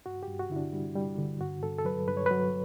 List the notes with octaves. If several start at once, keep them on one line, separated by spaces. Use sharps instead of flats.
G2 F#4
G4
G2
F#4
D3 E4
D4
G3
G3
D3
G2 F#4
G2 A4
A4
F#3 B4
G2 B4
C#5
F#3 B4